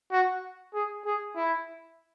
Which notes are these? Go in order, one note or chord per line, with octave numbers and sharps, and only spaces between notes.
F#4
G#4
G#4
E4